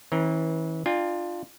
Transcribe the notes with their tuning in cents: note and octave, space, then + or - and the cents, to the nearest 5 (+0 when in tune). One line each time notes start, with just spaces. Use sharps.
E3 -30 C#4 -45 A#5 +0
D4 +30 F4 +0 G5 +40